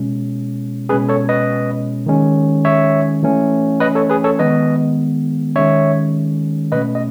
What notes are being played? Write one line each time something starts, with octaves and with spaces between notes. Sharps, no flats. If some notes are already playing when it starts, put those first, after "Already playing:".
Already playing: B2 G#3 C#4
B2 G#3 C#4 G#4 B4
A4 C#5
B4 D#5
D#3 G#3 C#4
C#5 E5
E3 A3 C#4
B4 D#5
A4 C#5
G#4 B4
A4 C#5
D#3 G#3 B3 B4 D#5
D#3 G#3 C#4 C#5 E5
B2 A3 C#4 B4 D#5
D#5